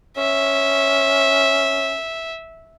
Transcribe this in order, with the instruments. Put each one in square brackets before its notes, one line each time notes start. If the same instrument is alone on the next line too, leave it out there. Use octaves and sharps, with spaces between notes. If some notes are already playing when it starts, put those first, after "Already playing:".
[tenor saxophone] C#4 [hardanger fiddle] E5